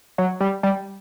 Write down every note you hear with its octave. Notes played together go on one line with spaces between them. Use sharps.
F#3
G3
G3